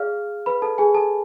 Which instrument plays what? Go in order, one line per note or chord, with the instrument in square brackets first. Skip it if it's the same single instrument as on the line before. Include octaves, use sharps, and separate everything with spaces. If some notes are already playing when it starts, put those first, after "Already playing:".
Already playing: [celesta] G#4 D5 F5 F6
B4 B5
A4 A5
G#4 G#5
A4 A5